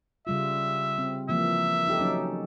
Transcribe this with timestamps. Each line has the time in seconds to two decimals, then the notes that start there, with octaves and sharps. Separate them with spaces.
0.27 C#3 G3 F4 E5
0.98 C4
1.29 E3 F3 A#3 E5
1.87 D#4 G4 A4
2.00 F#3 C#4 D#4